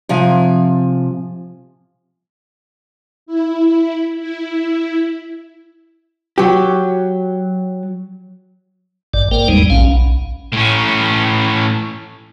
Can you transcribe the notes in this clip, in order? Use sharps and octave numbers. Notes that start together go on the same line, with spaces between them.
C3 F3 G#5
E4
E4
F#3 G4
G#1 G2 D5
A#3 A#4 C5 D5 G5
E2 G#2 G3 G#3 D#4
A#1 C#4 F5
B1
A2 C#4